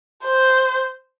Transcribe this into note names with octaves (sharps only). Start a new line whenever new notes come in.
C5